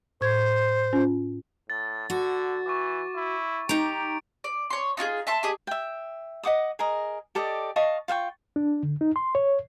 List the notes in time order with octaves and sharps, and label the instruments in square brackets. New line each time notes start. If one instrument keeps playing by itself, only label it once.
[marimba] A2 C#6 G#6 [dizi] C5
[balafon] C#4 [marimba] F4
[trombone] A2 [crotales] A6
[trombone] D3 [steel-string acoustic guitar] F#4
[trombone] E3 [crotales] C#6 D6
[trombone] E4
[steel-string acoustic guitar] D#4 A#5 [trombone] G4 [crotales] D7
[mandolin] D5
C#5 C6
D#4 F4 F#4 G#4
E5 A5 C6
G4 G#4 D#5
[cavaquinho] E5 G5
D#5 F#5 D6 D#6
G#4 A#4 D#5
G4 A4 D5 D#5
D#5 F5 A5 C#6
F4 F5 G5 C#6
[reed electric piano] D4
D3
D#4
C6
C#5